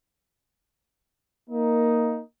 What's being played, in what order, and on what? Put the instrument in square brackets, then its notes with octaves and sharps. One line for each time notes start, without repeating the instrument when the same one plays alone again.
[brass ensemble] A#3 D#4